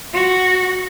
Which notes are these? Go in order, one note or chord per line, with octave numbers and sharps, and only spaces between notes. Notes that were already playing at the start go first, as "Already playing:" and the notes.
F#4